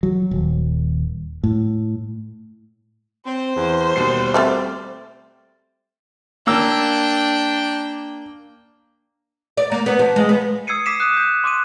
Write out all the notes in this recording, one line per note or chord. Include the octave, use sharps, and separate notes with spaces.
F#3
D#1
A2
C4 C5
E2
D#2 B2 G3 C7
A3 C4 F#4 D6 F6 A6
A#3 D4 G5 E6
D5
A#3
B3
F3
G#3
B3
D#6 E6 G#6 C7 C#7 D#7
D6 B6 C7 D#7 E7
D#6 F#6 E7
G6
C6 D6 F#6 D#7